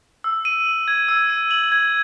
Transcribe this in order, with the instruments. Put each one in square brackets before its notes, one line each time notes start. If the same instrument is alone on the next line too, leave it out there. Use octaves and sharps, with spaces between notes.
[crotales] E6
D#7
F#7
G#6
E6
D#7
F#7
G#6